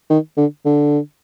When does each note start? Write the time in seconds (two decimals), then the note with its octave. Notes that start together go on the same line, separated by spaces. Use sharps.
0.10 D#3
0.37 D3
0.65 D3